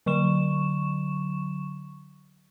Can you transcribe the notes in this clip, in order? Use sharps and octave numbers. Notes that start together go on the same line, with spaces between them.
D3 F#3 C#6 E7